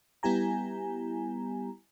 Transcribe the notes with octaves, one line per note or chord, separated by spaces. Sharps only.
G3 B3 E4 G4 G#5 A#5